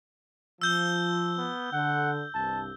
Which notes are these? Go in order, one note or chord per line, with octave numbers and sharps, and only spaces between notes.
F3 E6 G6 G7
B3
D3 F#5
C2 G2 A5